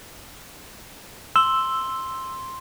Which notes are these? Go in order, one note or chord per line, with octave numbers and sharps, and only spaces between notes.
C6 E6 G7